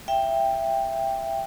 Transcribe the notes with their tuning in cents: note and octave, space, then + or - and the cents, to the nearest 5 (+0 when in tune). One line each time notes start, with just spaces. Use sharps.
E5 +15 G5 +10